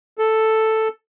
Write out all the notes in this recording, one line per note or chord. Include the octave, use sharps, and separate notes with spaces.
A4